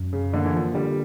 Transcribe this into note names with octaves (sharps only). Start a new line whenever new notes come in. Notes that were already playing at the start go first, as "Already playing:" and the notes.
Already playing: F#2
C#3
D3 A#3
E3
F3
D3 G3